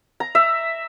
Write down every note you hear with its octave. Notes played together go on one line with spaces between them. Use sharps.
A#5
E5